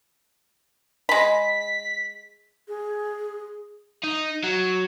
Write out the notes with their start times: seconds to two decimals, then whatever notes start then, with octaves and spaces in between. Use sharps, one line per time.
1.09 G#3 B5 B6
2.68 G#4
4.04 D#4
4.44 F#3